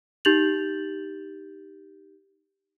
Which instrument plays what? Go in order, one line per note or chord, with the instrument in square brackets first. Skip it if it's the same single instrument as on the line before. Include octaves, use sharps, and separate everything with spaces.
[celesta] D#4 G4 G6 A6 F7 F#7